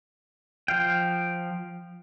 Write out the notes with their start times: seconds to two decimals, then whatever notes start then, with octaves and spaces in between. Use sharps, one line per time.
0.68 F3 F5 G5